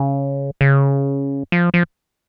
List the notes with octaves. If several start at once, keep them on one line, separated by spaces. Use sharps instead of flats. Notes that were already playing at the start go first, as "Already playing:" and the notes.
Already playing: C#3
C#3
F3
F3